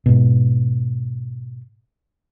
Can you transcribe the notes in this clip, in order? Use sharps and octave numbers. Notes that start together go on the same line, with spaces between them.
G#2 B2